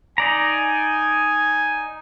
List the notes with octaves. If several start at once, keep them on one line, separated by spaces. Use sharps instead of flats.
D#4 D5 G#5 A#5